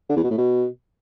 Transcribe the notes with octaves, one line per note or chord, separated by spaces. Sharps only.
D3
E2
B2
A2
B2